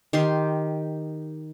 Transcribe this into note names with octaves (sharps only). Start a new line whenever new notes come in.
D#3 G4 C6